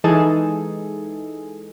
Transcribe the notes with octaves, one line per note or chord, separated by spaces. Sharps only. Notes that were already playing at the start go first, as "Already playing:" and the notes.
E3 G#3 D#4 G#4 A4